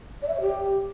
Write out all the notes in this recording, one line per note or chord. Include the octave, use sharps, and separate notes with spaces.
D5
E5
C#5
G4